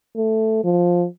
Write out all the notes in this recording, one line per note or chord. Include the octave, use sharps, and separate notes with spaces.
A3
F3